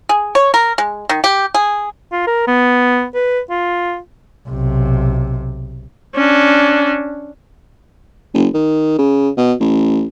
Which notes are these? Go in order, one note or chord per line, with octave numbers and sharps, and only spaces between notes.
G#4
C#5
A#4
G#3
D#3
G4
G#4
F4
A#4
B3
B4
F4
B1 C3
C#4 D4
F#1
D#3
C#3
B2
A1